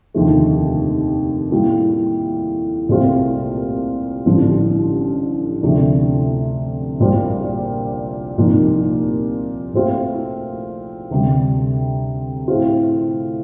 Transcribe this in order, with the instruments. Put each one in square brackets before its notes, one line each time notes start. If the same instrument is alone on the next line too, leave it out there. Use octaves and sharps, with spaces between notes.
[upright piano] F1 D#2 D3 F3 A3
A2 G3 A#3 F4
C2 A#2 A3 C4 F4
A1 G2 D3 F3
D2 C3 F3 A3 D4
A#1 A#2 G3 C4 F4
C2 A#2 F3 A#3 D#4
A#2 A3 C4 F4
D2 C3 G3
A2 A3 C4 F4